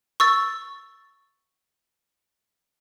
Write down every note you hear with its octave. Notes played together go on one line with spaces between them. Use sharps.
C#6 E6 A6